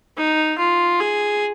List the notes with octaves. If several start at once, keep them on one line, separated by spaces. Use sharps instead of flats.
D#4
F4
G#4